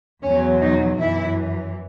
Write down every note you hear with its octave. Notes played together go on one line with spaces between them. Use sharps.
E2 B2 F#3 C#4
D#4
F#2 E3 E4